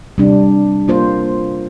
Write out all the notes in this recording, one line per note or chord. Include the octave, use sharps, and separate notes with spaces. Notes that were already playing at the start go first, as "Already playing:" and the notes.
C3 G3 D4
A#3 F4 C5